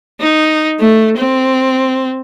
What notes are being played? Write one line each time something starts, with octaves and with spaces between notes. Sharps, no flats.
D#4
A3
C4